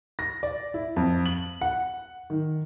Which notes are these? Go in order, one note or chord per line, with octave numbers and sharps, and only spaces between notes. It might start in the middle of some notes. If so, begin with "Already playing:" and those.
A#6
D5
E4
F2
F#7
F#5
D#3